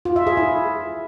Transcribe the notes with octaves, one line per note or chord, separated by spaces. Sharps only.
F4
E5
G#4
E4